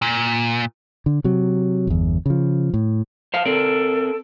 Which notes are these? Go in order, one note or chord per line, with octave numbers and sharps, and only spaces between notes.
A#2
D3
C3 F#3
G1 E2
C#3 F3
A2
C5 F5 A5
C4 A4 A#4 D5